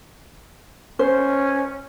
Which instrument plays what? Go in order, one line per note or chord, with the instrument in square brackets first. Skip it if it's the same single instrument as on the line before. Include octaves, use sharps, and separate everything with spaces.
[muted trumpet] C#4 [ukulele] C5